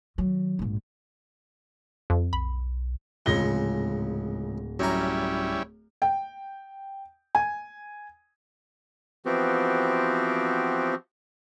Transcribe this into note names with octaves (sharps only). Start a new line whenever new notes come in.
D#3 F#3
A#1 G#2
F2
B1 B5
D1 F2 G#2 C#3 A#6 G7
F#2 G3 C#4 E4 A#4
G5
G#5
E3 F3 B3 C4 F#4 G4